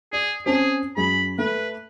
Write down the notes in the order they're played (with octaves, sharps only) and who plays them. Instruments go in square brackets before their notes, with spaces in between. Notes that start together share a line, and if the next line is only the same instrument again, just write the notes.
[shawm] G#4 [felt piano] D5
[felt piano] C4 C#4 A5 [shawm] G#4
[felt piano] F#2 G#4 [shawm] B5
[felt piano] A3 [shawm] B4